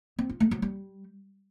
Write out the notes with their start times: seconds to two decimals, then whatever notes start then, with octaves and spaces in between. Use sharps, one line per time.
0.19 C4
0.29 F4
0.40 A3
0.51 F#3
0.62 G3